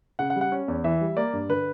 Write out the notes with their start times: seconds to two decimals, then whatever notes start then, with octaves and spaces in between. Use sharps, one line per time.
0.19 C#3 F#5
0.30 F#5
0.36 G3
0.41 F#5
0.52 C#4
0.68 E2
0.84 E3 E5
1.01 G3
1.17 A#3 D5
1.33 G2
1.49 D3 B4